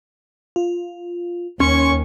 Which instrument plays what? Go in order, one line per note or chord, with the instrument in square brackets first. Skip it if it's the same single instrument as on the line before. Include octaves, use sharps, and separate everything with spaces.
[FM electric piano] F4
[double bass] D#2 [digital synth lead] C#4 [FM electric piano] C6 [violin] C#6